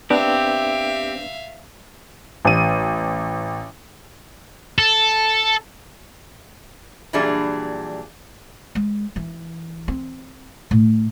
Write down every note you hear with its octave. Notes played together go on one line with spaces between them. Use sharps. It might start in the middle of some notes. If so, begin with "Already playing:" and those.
B3 C4 D4 G4 B4 E5 F5
A1 D#7
A4
A#2 E3 F#3 G3 D4 G#4
G#3
E3
C4
A2